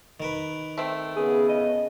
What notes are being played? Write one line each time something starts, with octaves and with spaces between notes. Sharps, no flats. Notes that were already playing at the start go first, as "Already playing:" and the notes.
D#3 A#4 B4
A3 C4
C#3 B3 G#4
D#5